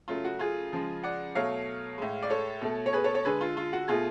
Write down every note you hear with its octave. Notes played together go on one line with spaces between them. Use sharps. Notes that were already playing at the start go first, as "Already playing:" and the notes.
C#3 F#3 A3 F4
F#4
F4 G#4
C#3 F3 G#3
D5 F#5
B2 F#3 A3 C#5 F5
A2 G#3
D5
A4 C#5
B2 A3
C#5
G#4 B4
A4 C#5
A4 C#5
D3 G#3 G#4 B4
F4
F4
F#4
B2 A3 F4 G#4